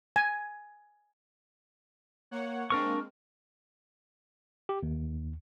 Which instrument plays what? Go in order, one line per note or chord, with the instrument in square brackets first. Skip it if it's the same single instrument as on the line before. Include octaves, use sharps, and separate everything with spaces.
[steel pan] G#5
[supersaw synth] A#3 C#5 F#5
[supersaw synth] G#3 A#3 C4 [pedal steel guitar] D4 A#4 C#6
[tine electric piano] G4
D#2